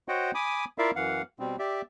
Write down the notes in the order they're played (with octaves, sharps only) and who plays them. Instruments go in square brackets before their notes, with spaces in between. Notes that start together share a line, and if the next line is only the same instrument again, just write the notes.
[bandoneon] F#4 C5 C#5 D#5 F#5 G5
G#5 B5 D6 D#6
E4 F4 A#4 D5 E5 F5
F#2 E3 F5 F#5
B2 G3 C4
G4 D5 E5